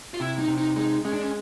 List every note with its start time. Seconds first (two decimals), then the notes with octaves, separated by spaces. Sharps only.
0.14 F4
0.20 C3 E4
0.39 D#4
0.48 C3
0.58 D#4
0.76 G#3 D#4
1.05 G#3 C#4
1.13 D4
1.22 C#4